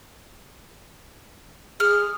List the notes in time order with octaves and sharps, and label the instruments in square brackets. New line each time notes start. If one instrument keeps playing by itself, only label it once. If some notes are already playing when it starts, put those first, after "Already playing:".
[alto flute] G#4 [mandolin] F6